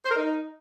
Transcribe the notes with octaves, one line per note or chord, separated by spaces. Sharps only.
C5
A#4
D#4